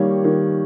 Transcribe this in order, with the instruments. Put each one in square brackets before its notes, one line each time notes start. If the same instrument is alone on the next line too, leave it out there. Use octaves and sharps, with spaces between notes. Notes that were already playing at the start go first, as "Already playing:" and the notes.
Already playing: [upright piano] D#3 G3 A#3 C#5
D#3